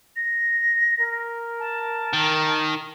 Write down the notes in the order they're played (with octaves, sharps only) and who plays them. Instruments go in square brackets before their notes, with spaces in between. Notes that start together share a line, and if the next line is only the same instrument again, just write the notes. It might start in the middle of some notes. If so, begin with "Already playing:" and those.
[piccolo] A#6
[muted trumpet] A#4
[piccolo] A5
[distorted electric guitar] D#3